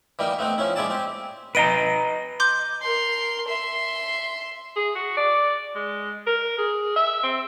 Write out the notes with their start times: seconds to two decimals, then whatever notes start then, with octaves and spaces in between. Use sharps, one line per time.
0.19 E3 G3 A#3 D#4
0.39 A3 B3 C4 D#4
0.58 F3 C#4 E4
0.76 A#1 G#3 E4 G#4 D5 A5
0.90 C4 G4
1.55 B4 D#5 A#5 D7 D#7 G7
2.40 C6 D6 G6
2.82 A#4 C6
3.48 E5 C6
4.76 G#4
4.95 F#4
5.17 D5
5.75 G#3
6.27 A#4
6.58 G#4
6.96 E5
7.23 C4